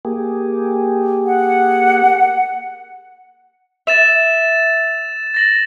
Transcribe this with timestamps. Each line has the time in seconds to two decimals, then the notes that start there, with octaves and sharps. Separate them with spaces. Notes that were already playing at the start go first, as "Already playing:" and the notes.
0.05 A#3 G4 G#4
1.26 F#5
3.87 E5 A6 E7 F7
5.34 A6 A#6 F#7